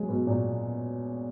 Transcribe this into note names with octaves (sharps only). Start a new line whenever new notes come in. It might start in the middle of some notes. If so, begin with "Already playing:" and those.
Already playing: F#3 G#3
B2
A#2